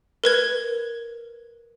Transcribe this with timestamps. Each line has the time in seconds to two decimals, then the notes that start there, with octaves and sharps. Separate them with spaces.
0.24 A#4 B4 G#6